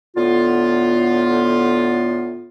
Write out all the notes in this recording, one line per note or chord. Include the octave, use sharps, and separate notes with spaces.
A2 D3 B3 F4